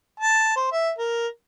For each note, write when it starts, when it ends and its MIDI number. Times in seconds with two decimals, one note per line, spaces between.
0.20 0.56 81
0.56 0.71 72
0.72 0.91 76
0.98 1.27 70